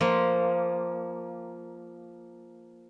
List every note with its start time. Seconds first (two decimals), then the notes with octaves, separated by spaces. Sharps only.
0.01 F3 A#3